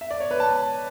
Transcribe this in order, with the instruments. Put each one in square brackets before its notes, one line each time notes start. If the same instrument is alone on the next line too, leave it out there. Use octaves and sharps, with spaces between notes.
[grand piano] E5
D5
C#5
B4
A5